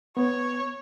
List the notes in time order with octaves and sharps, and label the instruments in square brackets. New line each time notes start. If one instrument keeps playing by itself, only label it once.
[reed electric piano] B3 [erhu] C#5